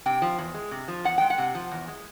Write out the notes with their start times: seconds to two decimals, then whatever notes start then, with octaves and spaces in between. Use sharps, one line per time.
0.06 C3 G5
0.22 F3
0.38 E2
0.54 G#3
0.71 C3
0.88 F3
1.04 E2 F#5
1.18 G#3 G5
1.30 F#5
1.38 C3
1.55 F3
1.71 E2
1.88 G#3